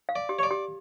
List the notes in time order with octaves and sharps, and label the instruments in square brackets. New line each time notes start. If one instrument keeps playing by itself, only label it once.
[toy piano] F5
[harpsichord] D5
[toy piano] G4
[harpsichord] C#5
D5
[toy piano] G4